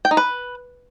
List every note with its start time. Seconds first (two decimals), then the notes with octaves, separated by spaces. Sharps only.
0.05 G5
0.11 D#4
0.17 B4